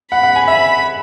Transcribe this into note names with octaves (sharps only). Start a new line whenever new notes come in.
F#5 B5
F#5
G#5
E5 B5